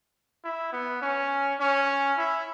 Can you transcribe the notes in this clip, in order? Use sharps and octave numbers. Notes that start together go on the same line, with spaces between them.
E4
B3
C#4
C#4
E4